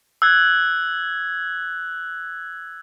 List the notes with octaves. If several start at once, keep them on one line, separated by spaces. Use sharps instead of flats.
E6 F#6 G#6